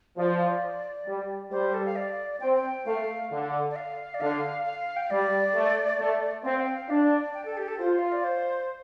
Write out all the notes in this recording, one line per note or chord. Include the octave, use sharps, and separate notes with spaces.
F3 D5
G3
G3 C5
A4
F5
D5
C4 G5
G5
A3 F5
D3
D5
F5
D5
D3 F5
F5
G5
F5
G3 D5
A3
A3
C4 F5
G5
F5
D4 D5
G5
A4
G4
A4
F4 C5
F5
D5
C5